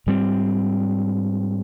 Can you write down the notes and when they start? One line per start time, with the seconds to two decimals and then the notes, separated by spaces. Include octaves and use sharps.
0.07 G#2 G3 C4